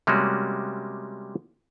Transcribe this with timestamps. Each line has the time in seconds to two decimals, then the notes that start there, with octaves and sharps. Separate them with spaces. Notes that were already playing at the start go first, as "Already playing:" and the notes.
0.07 C3 G3 G#3 A#3 C#4 F#4